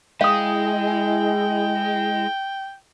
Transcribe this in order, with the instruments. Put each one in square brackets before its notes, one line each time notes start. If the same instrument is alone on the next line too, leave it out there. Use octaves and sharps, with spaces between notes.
[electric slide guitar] G#3 [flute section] E4 G#4 D#5 [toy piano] F5 D#6 [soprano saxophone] G5